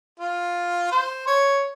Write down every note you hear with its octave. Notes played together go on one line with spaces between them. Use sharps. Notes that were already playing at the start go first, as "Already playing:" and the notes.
F4
C5
C#5